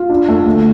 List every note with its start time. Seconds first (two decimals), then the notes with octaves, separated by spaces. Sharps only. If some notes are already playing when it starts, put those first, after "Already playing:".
Already playing: F4
0.10 D4
0.29 A3
0.46 D2